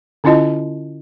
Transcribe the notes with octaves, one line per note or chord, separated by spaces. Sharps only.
D3 C#4 E4 F4 D#5 A5